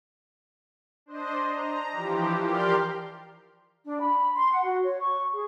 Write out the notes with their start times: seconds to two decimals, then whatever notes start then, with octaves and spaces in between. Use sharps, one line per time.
1.06 D4 C5 D#5
1.47 A#5
1.91 E3 F3 G4
2.42 G4 A#4 D5 C6 F6 G6
3.85 D4
4.01 B5
4.35 C6
4.51 F#5
4.64 F#4
4.82 C#5
4.98 C#6
5.32 G#4